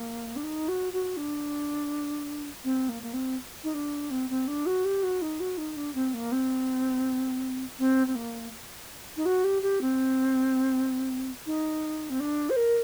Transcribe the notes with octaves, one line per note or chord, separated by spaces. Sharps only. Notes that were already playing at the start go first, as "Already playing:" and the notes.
Already playing: A#3
D4
D#4
F#4
F#4
D4
C4
A#3
A#3
C4
D#4
D4
C4
C4
D4
F#4
G4
F#4
D#4
F#4
D#4
D4
C4
A#3
C4
C4
C4
A#3
D#4
F#4
G4
G4
C4
D#4
C4
D4
C5
A#4